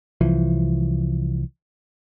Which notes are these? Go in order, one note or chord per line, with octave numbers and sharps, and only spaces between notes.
C2 E3 F3